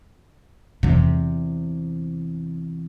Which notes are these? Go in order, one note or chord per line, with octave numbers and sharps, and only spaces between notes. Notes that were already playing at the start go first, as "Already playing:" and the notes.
E2 C3